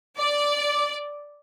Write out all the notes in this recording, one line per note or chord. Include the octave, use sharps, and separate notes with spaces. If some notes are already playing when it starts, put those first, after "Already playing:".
D5